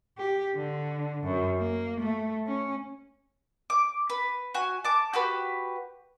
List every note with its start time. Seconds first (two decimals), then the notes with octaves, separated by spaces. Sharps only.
0.18 G4
0.55 D3
1.24 F#2
1.59 A#3
2.00 A3
2.46 C#4
3.70 D6
4.10 B4
4.54 F#4 G#5
4.84 A5 D6
5.14 F#4 G4 B4